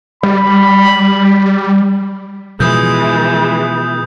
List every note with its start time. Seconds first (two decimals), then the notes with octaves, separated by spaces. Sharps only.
0.23 G3 B5
2.60 B2 E3 F3 G#3 D#6 G6